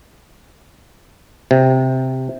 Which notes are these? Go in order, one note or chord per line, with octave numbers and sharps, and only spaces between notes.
C3